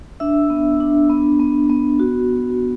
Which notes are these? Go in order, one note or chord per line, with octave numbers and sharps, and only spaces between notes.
D4 E5 E6
B3
D4
B3
B3
B3
F#4